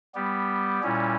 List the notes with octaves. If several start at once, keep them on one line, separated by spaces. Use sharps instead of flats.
G3 B3 G4
A#2 G3 C#4 E4